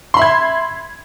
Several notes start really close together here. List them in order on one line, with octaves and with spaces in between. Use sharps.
C6 B5 E5 G#6